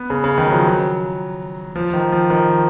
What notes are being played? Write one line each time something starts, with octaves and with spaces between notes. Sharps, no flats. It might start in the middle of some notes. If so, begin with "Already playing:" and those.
Already playing: B3
C#3
C#3
D#3
F#3
F3
F#3
F3
D#3
F3
D#3